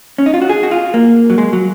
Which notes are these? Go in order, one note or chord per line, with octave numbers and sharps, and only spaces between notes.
C#4
D#4
F4
F#4
G#4
F#4
F4
A#3
F#3
G#3
F#3